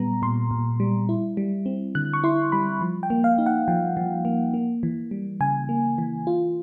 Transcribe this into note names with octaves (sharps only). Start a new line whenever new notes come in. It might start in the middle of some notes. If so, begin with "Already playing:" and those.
Already playing: A#2 G3 B3 A#5
A#2 C6
A#2
G3
E4
G3
C4
D3 F#6
C#6
E4 C6
G3 B5
F3
G5
A#3
F5
D#4
F#5
F3 G5
F3
A#3
A#3
E3
G3
C#3 G#5
A#3
E3
F4